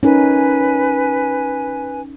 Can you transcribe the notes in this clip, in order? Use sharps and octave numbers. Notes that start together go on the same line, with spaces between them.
C#4 D#4 A#4 B4 G#5